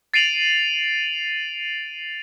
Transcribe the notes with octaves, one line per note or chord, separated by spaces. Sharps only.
A6 C7 D7 D#7 F7 F#7